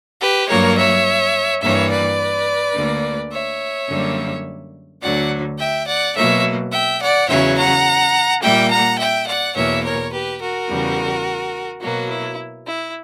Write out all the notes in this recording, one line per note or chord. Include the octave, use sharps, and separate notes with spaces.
G4 B4
G2 F#3 A#3 A#4 C#5
C#5 E5
G2 E3 A#3 C#5 E5
B4 D5
D2 D3 A#3
C#5 E5
F#2 D3 G3 A#3
D2 D3 F#3 D5 F#5
E5 G5
D5 F#5
B2 F#3 A#3 C#5 E5
E5 G5
D5 F#5
E2 C#3 F#3 C#5 E5
F#5 A#5
A#2 G3 A#3 E5 G5
F#5 A#5
E5 G5
D5 F#5
E2 B2 A#3 C#5 E5
A#4 C#5
G4 B4
F#4 A#4
E2 C#3 G3
B2 F#3 A#3 F#4
E4
E4